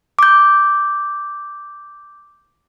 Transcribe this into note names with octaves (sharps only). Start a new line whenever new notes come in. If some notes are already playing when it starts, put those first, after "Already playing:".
D6 G6